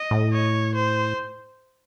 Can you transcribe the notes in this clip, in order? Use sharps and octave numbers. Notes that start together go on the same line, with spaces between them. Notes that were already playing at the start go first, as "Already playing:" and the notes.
Already playing: D#5
A2
C#5
C5